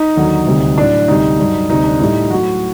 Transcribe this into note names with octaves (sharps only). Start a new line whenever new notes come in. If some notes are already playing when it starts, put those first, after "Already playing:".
Already playing: D#4
D#2 D3 F#3
D2 C3 G3
A2 F#3 D4
D2 C3 G3 D#4
G2 F#3
D2 C3 G3 D#4
D4
A2 G3 D#4
A2 F#3 F#4